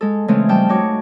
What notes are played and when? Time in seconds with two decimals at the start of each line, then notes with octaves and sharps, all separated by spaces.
0.01 G#3 A4
0.28 C#3 E3 G#3 A3 C4 C#4
0.49 F3 G3 G5 A5
0.69 D#4 F#4 C#5 D6